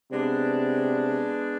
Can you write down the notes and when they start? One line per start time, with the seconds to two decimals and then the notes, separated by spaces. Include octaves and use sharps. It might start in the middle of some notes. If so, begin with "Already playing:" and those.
0.11 C3 G#3 B3 D4